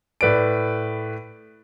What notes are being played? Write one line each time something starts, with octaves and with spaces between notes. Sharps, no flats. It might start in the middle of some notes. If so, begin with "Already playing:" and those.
A2 B4 D5 D7